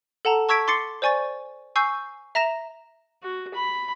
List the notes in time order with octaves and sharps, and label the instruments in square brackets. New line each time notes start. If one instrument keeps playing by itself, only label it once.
[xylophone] A4 F#5 A5 A#5
A5 C#6 E6 G#6 B6 D7
C6 D6 A6 C7 C#7 G7
C5 D5 G#5 C#6 A6
G#5 C#6 E6 G6 C7
E5 A#5 A#6 E7 F7
[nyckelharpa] F#4
B5